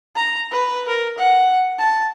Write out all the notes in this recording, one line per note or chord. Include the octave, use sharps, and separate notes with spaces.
A#5
B4
A#4
F#5
A5